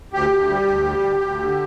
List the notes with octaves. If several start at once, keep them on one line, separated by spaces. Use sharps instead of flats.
D2 G4
D2
G3
D2
G3
D2
D2
D3